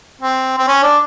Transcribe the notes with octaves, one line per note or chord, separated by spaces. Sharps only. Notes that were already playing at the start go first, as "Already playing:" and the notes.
C4
C4
C#4
D4